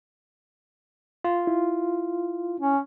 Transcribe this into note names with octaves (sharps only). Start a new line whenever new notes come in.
F4
E4
C#4